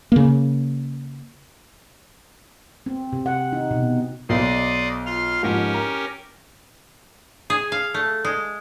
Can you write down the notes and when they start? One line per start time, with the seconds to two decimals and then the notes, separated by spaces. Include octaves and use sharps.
0.12 C#3 A#3
2.86 C4
3.13 C3
3.26 F#5
3.53 D#4
3.71 B2
4.29 B1 C5 D5 D#5 C6
5.06 F4 C6 F6
5.43 F2 G#2 C#4 G4 A#4
5.74 A#5
7.50 G#4
7.72 F5
7.94 A3
8.25 G#3